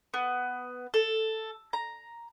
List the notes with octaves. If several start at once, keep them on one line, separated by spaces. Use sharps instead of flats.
B3
A4
A#5